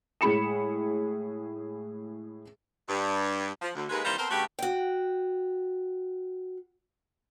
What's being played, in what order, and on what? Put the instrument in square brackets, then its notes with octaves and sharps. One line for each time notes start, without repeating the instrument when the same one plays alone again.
[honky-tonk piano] A2 G#3 G#4 B5 C#7 E7
[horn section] G2
[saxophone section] F3
D2
D#2 G#3 B4
C3 D#3 E3 G3 A#3 C5
B3 C4 A4 A#4 C5
G2 C#3 A3 F#4 G4
[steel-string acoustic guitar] F#4 G5